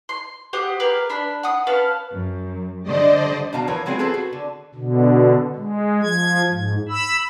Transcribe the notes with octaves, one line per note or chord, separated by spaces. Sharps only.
C6
G4 C5 F#5 D#6
G4 G#4 A#4 B4
D4 B5
F#5 D#6
C#4 B4 F5 A5
F#2
D3 G3 C5 D5 D#5
B2 D4 F#4 F5 A#5
E3 F3 A#4 B4 C#5
F#3 G#3 C4 F4 G#4 C#5
C4 F4 G#4 A4 B4 C5
F#4
D3
B2 D3
G#3
F3 G#6
G#2
B5 E6